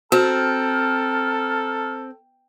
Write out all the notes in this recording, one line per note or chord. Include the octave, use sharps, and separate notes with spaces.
C4 F#4 A4 A5 A#5 F6